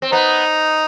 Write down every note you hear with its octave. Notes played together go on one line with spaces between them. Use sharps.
C4
B3 D#4